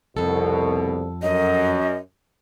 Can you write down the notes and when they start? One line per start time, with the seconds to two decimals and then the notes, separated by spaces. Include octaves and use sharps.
0.17 C2 F2 B2 A4
1.22 F#2 D#5